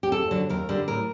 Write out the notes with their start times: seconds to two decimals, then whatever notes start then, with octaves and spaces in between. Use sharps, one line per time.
0.03 G4
0.12 D#2 A4
0.31 D3 F#3
0.50 D#2 A#4
0.69 D3 G3
0.88 A2 A#4